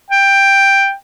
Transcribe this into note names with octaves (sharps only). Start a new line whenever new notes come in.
G5